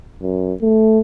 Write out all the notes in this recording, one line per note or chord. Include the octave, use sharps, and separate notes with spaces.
F#2
A3